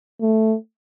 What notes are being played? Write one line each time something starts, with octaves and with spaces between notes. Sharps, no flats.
A3